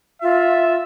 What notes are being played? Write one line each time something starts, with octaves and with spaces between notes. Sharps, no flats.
F4 E5